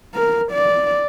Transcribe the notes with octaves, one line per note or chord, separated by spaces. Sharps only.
A#4
D5